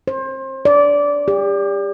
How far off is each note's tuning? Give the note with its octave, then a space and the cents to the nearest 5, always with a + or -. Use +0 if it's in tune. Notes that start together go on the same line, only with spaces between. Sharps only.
C5 +30
D5 -20
G4 +35